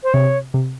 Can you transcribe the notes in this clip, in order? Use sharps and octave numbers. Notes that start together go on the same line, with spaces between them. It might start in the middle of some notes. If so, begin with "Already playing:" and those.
C5
C3 C#5
C3